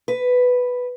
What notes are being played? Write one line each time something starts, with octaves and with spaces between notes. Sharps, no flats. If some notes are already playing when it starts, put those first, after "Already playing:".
B4